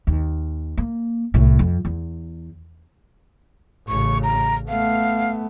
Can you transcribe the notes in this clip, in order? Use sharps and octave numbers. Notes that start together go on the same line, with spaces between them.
D#2
A#3
C2 A2
F2
E2
A1 C#3 C#6
A#5
A3 B3 F5